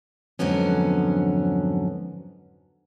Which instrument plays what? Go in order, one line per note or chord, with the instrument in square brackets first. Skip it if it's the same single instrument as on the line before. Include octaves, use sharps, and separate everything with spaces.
[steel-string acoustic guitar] F2 G#2 D3 F#3 B3 C#4